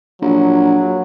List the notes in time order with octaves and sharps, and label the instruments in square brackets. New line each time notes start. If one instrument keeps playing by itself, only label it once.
[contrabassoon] A#1 [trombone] F#3